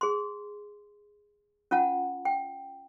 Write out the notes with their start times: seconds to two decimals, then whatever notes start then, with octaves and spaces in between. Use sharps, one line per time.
0.01 G#4 C6
1.71 C#4 F4 F#5 A5
2.25 G5